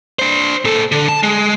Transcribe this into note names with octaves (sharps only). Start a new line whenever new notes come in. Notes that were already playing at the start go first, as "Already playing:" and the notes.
D4 C5
A#2 A4
D3
A5
G#3